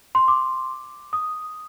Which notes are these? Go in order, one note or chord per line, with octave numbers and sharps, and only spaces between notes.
C6
D6
D#6